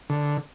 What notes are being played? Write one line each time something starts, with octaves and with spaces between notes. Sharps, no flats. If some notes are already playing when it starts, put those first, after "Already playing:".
D3